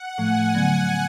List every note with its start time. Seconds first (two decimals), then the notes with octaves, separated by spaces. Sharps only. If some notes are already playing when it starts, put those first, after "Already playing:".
Already playing: F#5
0.17 A2 F3 A3 G#5
0.55 D3 F#3 B3